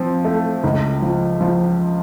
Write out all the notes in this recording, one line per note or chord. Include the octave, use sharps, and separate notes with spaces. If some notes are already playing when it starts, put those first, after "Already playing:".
Already playing: F3 C4
A3
C#2
F3
F3